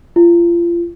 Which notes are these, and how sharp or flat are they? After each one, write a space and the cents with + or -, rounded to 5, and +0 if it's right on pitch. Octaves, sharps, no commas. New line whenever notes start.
F4 -30